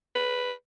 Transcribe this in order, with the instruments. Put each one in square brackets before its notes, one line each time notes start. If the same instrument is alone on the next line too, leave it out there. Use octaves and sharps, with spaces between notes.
[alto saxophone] B4